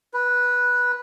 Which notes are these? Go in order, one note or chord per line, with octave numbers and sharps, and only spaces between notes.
B4